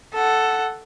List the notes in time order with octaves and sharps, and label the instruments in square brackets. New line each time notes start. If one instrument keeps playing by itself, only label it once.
[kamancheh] A4 F#5